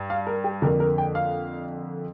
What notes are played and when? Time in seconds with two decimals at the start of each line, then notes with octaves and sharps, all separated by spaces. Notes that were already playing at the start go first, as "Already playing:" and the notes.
Already playing: G2
0.10 F5
0.27 A#4
0.44 G4
0.62 F2 D3 A#3 A#4
0.80 A#4
0.98 G5
1.15 F5